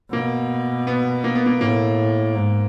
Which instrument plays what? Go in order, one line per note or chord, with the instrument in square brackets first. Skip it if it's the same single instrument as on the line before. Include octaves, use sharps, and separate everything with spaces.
[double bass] B2 [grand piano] A#3
[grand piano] B3
A#3
B3
A#3
[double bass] A2 [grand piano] A#3
[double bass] G#2